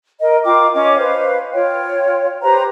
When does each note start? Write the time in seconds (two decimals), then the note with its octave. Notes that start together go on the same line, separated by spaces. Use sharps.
0.20 A#4 D#5
0.44 F4 A#4 G5 D6
0.74 C#4 D#5 D6
0.97 B4 C5 F5
1.53 F4 C#5 G5
2.43 G4 B4 C5 A#5